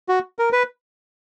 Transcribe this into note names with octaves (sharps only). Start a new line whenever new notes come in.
F#4
A#4
B4